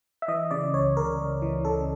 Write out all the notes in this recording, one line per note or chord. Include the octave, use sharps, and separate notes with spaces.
E5
E3 D#5
C#3 D5
C#2 C#5
C#3 A#4
C#2
E3
C#3 A4